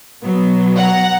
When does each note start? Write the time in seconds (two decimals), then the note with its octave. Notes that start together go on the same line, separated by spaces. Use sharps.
0.24 B2 F#3 B3
0.77 F#5 A#5